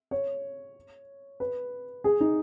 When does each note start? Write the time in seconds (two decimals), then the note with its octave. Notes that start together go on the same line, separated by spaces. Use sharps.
0.11 C#5
1.40 B4
2.04 G#4
2.20 D#4